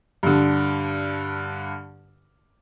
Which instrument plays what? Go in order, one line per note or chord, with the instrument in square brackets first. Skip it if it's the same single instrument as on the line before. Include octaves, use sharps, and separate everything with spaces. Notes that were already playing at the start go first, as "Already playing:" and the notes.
[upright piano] G2 D3